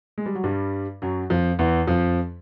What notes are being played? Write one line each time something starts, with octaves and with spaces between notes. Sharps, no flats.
G#3
G3
F#3
G2 G3
F#2 F#3
F2 F3
E2 E3
F2 F3